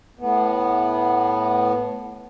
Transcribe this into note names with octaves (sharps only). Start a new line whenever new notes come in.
A2 B3